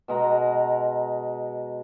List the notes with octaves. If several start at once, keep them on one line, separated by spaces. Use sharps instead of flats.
B2 G#3 A#5